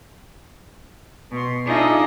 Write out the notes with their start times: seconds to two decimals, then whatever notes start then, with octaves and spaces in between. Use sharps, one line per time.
1.32 B2 C6
1.65 D4 D#4 F4 G#4 D#5 E5